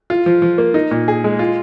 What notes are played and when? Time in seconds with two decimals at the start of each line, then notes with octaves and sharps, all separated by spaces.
0.10 F4
0.26 F3
0.42 F3
0.58 A#3
0.74 D#4
0.91 A#2
1.08 G#4
1.24 G#3
1.39 F4